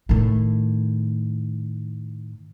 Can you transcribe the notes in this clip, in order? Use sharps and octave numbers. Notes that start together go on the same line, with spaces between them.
A2 D#3